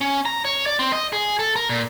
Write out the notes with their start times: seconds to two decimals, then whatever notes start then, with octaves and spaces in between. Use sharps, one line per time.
0.01 C#4
0.26 A#5
0.45 C#5
0.66 D5
0.79 C4
0.92 D#5
1.13 G#4
1.39 A4
1.56 A#4
1.69 A#2